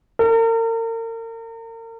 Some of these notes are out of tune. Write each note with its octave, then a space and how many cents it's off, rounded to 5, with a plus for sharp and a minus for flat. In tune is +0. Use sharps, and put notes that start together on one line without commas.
A#4 -40